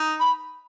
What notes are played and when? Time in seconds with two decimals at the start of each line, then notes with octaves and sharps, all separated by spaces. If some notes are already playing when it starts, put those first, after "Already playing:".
Already playing: D#4
0.20 B5